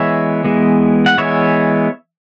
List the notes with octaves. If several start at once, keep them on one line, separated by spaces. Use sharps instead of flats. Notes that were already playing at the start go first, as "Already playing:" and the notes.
Already playing: E3 G#3 B3 C#5 E5
E3 G#3 B3
F#5
E3 G#3 B3 C#5 E5